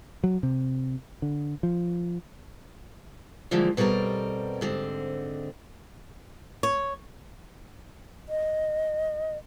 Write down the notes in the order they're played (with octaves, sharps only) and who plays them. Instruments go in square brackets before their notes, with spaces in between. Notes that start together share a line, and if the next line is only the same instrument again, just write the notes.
[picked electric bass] F#3
C3
D3
F3
[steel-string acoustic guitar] D3 E3 F3 G3 G#3 A#3
B2 G3 C4 A4 A#4
G#2 D3 C4
[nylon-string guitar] C#5
[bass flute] D#5